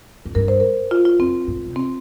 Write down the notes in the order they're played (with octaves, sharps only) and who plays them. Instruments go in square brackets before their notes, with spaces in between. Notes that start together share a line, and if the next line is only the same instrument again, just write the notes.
[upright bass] F2
[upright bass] G2 [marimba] A#4
[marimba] C5
A#4
F4
F4
[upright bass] F2 [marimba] C4
[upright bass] G2
A#2
C3
[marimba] C4